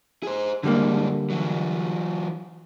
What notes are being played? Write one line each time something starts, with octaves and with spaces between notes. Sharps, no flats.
G#4 C5
F#2 D3 G3 G#3 A#3
E3 F#3